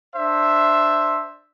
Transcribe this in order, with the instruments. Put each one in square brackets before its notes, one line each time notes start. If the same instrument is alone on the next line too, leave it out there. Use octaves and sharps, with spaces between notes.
[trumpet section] D4 C5 E5